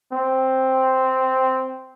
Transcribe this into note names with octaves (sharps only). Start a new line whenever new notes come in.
C4